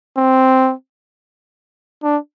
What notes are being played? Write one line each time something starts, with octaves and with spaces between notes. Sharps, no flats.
C4
D4